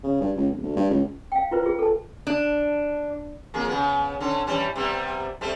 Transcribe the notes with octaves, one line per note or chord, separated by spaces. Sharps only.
C#3
G2
C#2
D1
D2
G2
C#2
F5 G5
E4 F4 B4 C5
F4 G#4
A4 A5
D4
F2 A#3 G#4
C#3 B3
D3 C#4
E3 G3 C#4
C3 G3 B3
G3 A3 C4